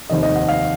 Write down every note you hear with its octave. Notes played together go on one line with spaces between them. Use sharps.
F1 D#2 D#3 D#5
D#5
F#5
F5